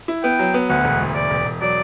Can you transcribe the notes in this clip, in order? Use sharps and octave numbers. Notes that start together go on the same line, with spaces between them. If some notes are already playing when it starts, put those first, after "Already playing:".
E4
B3 G5
F#3
B3
D2 F#5
E1
D2
E1 D5
E1
E1
F#3 D5